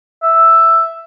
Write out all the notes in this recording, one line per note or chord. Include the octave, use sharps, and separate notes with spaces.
E5